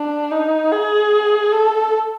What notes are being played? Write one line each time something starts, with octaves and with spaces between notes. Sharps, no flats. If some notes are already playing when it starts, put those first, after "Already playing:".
Already playing: D4
D#4
G#4
A4